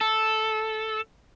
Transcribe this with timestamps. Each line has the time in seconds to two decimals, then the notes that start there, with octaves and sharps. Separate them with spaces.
0.01 A4